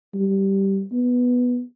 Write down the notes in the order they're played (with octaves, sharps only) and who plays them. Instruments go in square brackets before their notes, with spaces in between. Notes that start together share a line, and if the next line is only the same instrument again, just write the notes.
[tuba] G3
B3